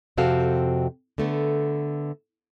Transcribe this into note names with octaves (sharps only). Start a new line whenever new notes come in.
F2 C3 C4 F#4 A4 F5
D3 A3 B3